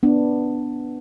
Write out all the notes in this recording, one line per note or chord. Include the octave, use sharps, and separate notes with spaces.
B3 D4